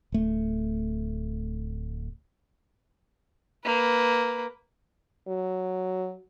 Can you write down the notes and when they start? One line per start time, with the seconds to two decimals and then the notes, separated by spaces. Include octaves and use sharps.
0.12 D1 A3
3.64 A#3 B4
5.28 F#3